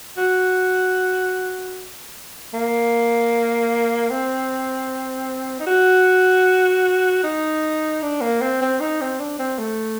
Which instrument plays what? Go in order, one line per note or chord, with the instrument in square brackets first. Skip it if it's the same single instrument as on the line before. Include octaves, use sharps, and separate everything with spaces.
[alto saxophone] F#4
A#3
C4
D#4
F#4
D#4
D4
A#3
C4
C4
D#4
C4
D4
C4
A3